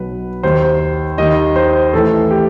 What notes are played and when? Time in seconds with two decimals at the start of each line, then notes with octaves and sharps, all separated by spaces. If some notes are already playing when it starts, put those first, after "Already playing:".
Already playing: B1 B2 B4
0.43 D#2 D#3 C5
1.18 D#2 D#3 D#5
1.56 C5
1.93 A1 A2 E3 A4
2.31 G4